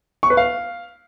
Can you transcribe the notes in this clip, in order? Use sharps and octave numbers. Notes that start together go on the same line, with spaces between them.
C#6
B4
F5